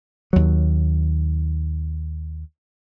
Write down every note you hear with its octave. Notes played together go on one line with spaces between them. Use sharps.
D#2 F#3